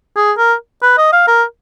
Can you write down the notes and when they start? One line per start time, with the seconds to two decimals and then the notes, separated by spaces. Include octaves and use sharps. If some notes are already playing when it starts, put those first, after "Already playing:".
0.16 G#4
0.38 A#4
0.82 B4
0.98 D#5
1.13 F5
1.27 A#4